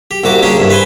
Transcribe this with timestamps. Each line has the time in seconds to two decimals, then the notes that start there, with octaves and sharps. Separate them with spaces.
0.11 G4
0.24 C2 A#2 F#4 D6
0.43 C#3 A#3 C#4 D4 G4
0.57 C2 G2
0.70 B4 C5 G#5 C6